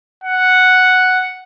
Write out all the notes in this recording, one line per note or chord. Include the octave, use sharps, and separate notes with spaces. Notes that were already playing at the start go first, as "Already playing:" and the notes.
F#5